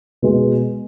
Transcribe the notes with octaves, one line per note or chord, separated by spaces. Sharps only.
B2 G#3